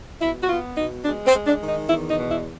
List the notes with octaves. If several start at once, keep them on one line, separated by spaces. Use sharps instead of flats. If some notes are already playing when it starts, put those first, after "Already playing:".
B2 E4
F#4
B3 F4
B2 D#4
G#3 D4
C4
G#3
D4
D#3
D#4
E2 E4
D#4
B2
E4